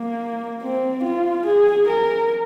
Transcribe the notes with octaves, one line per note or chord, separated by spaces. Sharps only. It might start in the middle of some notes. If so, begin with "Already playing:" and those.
Already playing: A#3
C4
F4
G#4
A#4